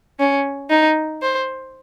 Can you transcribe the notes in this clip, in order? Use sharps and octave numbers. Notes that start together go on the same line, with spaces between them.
C#4
D#4
C5